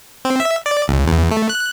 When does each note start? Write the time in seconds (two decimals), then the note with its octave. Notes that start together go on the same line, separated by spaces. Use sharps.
0.25 C4
0.40 E5
0.66 D5
0.88 C#2
1.07 E2
1.31 A3
1.49 F#6